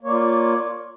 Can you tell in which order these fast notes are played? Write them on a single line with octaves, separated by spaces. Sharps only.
A#3 C#5 D5 F4